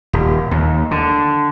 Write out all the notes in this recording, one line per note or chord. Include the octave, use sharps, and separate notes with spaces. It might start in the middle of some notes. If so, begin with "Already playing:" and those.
D#1
D#2
D3